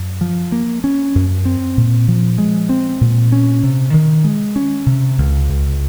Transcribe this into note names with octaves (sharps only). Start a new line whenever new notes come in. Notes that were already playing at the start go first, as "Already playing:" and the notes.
Already playing: F#2
F3
A#3
C#4
F#2
C4
A#2
F3
G#3
C4
A#2
C#4
C3
D#3
G#3
C#4
C3
C#2
C#2